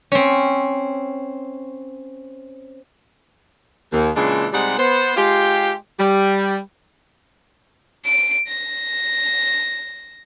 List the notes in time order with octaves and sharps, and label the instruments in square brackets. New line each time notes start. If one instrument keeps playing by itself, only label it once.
[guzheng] C4 C#4
[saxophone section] D#2
A#2 C#3 E3 G#3 D4
C3 G3 G#3 D#4 F#5
B3 C5
G#3 F4 G4
G3
[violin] D7
A#6